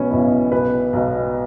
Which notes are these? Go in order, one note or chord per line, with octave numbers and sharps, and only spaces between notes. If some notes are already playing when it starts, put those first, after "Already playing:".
Already playing: B1 B2 B3 C#4
B1 B2 E4
B1 B2 B4
B1 B2